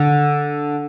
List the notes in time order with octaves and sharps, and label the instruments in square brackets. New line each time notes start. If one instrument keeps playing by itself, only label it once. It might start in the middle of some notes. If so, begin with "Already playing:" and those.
Already playing: [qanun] D3